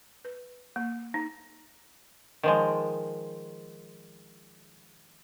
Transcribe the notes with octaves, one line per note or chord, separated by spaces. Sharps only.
B4
A#3
D#4
D#3 F3 G#3